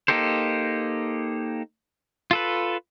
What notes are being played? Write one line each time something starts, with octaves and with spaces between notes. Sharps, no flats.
A#3 D#4 G4 A4 C5
F4 A4 B4